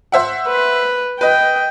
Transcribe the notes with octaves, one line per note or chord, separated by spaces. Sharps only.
C5 E5 F#5
B4
B4 D#5 G5